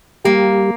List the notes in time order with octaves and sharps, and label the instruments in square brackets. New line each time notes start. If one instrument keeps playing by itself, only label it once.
[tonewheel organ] G3 G4 [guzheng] A#3